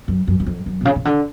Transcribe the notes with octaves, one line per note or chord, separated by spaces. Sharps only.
F#2
F#2
F#2
F2
F#2
B2
C#3
C#3
D3